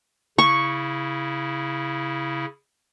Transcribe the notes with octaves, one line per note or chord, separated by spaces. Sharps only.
C#3 E4 C#6